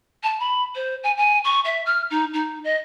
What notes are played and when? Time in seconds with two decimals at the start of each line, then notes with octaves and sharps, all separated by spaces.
0.23 A5
0.40 B5
0.75 C5
1.03 G#5
1.17 G#5
1.44 C#6
1.65 E5
1.86 F6
2.10 D#4
2.33 D#4
2.64 D#5